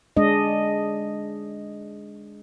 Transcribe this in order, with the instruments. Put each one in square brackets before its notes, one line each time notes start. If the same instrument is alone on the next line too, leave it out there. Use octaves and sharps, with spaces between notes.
[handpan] G#3 D4 D#5